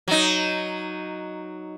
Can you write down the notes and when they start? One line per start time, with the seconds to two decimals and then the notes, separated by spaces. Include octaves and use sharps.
0.08 F#3 D#4